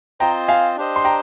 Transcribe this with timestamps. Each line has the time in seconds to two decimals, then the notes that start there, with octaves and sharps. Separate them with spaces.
0.20 C4 F4 C5 D#5 G5 A#5
0.48 F5 G#5
0.77 D4 G4 C5 D#5
0.96 C6
1.05 G5 A#5